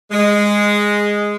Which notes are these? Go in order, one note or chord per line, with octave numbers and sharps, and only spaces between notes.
G#3